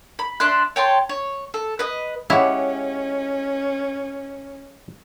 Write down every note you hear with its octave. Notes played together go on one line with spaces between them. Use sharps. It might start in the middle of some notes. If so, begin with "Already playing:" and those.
B5
D4 E5 C6 F#6
C#5 G5 A5 C6
C#5
A4
B4 D#5
G#3 C#4 E4 G4 C#5 F5 F#5